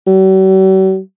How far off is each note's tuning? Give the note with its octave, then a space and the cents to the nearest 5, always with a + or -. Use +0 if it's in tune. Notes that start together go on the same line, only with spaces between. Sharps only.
F#3 +45